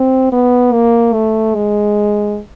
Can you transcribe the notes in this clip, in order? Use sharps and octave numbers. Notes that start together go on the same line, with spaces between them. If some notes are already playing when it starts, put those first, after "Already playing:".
Already playing: C4
B3
A#3
A3
G#3